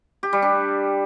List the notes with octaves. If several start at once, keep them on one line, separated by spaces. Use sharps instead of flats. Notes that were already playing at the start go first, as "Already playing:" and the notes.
G4
G3
D4